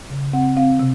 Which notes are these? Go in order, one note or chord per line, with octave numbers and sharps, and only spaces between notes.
C#3
C4 F#5
C4 F5
C3